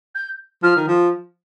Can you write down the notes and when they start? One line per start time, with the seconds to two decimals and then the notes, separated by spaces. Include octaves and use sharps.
0.15 G6
0.63 F3 F6
0.76 D#3
0.87 F3